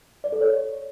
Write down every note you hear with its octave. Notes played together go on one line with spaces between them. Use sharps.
D5
A4
C#5